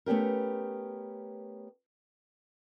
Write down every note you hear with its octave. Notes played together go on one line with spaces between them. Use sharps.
A3 B3 C#4 G4 A#4